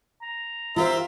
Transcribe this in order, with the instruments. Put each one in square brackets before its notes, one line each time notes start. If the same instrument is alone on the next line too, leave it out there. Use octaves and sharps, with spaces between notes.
[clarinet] A#5
[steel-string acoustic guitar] F4 G4 C5 [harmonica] A#4 E5 C6